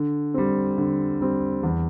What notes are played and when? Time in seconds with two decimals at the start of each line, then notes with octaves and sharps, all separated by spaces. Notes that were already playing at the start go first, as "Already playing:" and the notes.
Already playing: D3
0.34 G3 C4
0.78 D3
1.21 G3 C4
1.63 E2